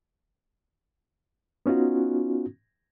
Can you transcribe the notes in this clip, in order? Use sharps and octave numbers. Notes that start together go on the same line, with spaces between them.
B3 C#4 D#4 F4 F#4